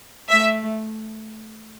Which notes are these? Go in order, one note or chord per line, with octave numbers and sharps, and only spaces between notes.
A3 E5